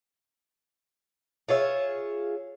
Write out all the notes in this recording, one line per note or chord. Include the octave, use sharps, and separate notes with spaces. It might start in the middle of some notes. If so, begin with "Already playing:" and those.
F4 G#4 C#5 E5